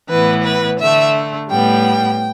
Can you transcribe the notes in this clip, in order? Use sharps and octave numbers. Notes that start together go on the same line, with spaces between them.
A2 E3 B3 B4
B4
D3 A3 E5
A2 G3 B3 G5